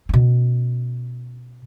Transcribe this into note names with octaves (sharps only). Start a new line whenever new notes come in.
B2 C#4